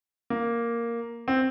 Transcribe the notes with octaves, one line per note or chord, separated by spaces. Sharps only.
A#3
C4